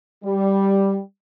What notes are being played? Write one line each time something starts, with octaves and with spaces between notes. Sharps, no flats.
G3